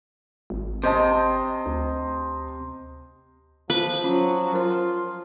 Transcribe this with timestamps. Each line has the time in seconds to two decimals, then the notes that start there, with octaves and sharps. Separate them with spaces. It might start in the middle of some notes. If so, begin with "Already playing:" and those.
0.50 G#1
0.84 C3 C5 D#5 A5
1.66 D2
3.70 F3 F4 B4
4.04 F#3 C#4 F4
4.54 F4 A#4 C5